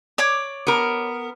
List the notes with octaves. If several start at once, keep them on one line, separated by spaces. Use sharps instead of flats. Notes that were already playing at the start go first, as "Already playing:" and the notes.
C#5 D5 D6
B3 A#4